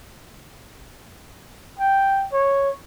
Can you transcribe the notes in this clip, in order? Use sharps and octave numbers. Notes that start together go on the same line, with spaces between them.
G5
C#5